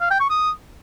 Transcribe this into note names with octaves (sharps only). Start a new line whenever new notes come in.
F5
G5
C#6
D#6